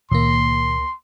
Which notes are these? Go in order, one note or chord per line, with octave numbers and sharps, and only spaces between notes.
C#2 A#2 D#3 A#3 C6